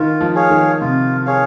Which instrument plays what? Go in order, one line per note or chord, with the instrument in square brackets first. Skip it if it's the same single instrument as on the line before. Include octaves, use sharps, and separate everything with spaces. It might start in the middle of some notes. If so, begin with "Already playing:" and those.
Already playing: [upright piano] D#3 [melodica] F4
[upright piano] F3
[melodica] G#4 C#5 F5
[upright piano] D#3
[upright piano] C3 [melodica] F4
[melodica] G#4 C#5 F5